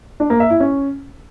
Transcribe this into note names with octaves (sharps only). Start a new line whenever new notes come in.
D4
A#3
E5
E4
C#4